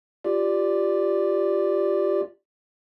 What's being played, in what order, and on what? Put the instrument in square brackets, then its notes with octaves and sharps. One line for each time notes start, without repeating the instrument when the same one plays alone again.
[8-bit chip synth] F4 G4 D5